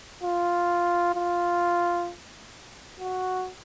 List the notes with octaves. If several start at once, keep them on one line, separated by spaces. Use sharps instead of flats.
F4
F4
F#4